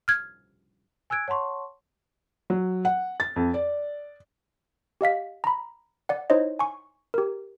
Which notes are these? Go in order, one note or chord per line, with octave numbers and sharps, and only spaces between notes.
F6 G#6
G#5 E6 F#6 G#6 D7
C#5 F#5 A5 C6 C#6
F#3
F#5
A6
F2
D5
G4 D#5 F5 B6
A#5 B5
D5 F#5
D#4 E4 C5 C#5 D#5
G#5 C#6
G4 A#4